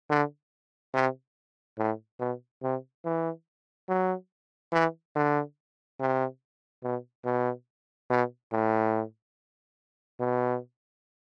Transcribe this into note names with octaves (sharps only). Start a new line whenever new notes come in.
D3
C3
A2
B2
C3
E3
F#3
E3
D3
C3
B2
B2
B2
A2
B2